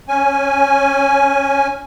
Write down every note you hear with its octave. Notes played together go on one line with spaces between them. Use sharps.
C#4 G#5